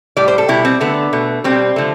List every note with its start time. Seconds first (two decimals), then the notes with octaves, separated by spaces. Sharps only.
0.17 A2 G3 D5
0.28 C5
0.38 A4
0.48 B2 G3 E4
0.65 C4
0.81 D3 A3 B3
1.13 B2 A3
1.44 B2 G3 C4
1.76 D3 F3 A3